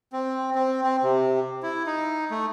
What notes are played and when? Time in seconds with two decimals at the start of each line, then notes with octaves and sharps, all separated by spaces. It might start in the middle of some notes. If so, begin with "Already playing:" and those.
0.12 C4
0.55 C4
0.84 C4
1.03 C3
1.63 E4
1.86 D#4
2.31 A3